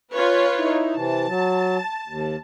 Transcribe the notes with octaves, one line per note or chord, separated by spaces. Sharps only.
C#4 F4 B4 C#5
D#4 E4
C3 E3 A5
F#3
D#2